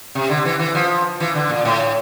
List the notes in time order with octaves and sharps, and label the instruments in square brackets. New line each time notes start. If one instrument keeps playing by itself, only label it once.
[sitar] C3
D3
E3
E3
F3
E3
D3
A#2
A2